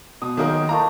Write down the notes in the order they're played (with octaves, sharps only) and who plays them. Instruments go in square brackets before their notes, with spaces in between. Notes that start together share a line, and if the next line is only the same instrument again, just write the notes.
[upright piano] B2 [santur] D#6
[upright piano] D#3 F#3 A#3 [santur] G#3 D#4 D#5
[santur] A3 A#3 E4 [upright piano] A#5